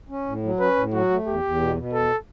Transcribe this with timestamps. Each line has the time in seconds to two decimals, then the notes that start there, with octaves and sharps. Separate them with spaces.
0.09 C#4
0.26 A2
0.43 F#3
0.59 C#4 B4
0.76 A2
0.92 F#3 F#4
1.10 A3
1.27 E2 G4
1.43 E2
1.60 B2
1.77 B2
1.93 E2 A4